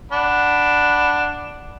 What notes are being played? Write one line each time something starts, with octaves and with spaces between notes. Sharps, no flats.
D4 F#5 B5